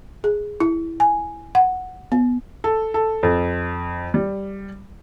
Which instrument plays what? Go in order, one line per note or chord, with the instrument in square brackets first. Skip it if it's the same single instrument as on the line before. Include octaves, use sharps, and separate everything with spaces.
[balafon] G#4
E4
G#5
F#5
B3
[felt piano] A4
A4
F2
G3